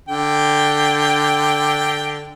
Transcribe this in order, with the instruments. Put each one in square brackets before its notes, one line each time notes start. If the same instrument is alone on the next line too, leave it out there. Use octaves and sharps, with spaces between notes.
[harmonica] D3 G5